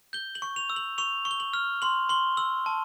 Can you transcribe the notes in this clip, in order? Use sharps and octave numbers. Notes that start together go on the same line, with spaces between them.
G6 G7
F#7
C#6
F7
E6
F#7
C#6 F7
C#6
G7
F#7
F6
C6 F#7
C6 G7
E6 F#7
A5